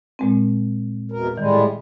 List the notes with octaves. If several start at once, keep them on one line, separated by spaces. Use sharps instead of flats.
A#2 G#3 C4
E2 B2 A#4
A2 D#3 G3 G#3